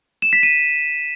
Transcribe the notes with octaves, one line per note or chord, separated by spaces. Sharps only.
E7
B6
D#7